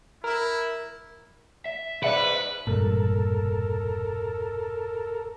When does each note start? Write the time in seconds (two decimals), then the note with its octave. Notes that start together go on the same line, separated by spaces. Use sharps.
0.24 E4 A#4
1.66 E5
2.03 G#4 B4 C5 D5 E5 C#7
2.67 E1 G2 A#2 A4 A#4